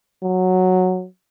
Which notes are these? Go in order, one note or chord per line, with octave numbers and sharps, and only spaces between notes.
F#3